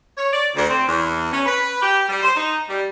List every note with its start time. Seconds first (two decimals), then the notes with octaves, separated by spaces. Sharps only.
0.18 C#5
0.32 D5
0.55 D2
0.68 C4
0.87 E2
1.32 C#4
1.46 B4
1.82 G4
2.09 G3
2.23 C5
2.37 D#4
2.68 G3